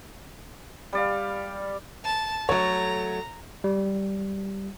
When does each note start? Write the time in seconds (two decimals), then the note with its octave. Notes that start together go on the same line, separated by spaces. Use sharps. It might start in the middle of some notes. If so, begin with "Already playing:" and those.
0.93 G3 D5 F5
2.05 A5
2.49 F#3 A3 C#5 A#5
3.64 G3